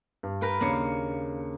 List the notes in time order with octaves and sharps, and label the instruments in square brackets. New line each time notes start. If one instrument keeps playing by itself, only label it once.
[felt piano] G2
[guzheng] A#4 B4 G5
[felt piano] D#2 D4 C#7 [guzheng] C#3 A#3